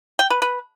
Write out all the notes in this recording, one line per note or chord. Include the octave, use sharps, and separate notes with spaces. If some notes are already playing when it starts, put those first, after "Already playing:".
G5
B4
B4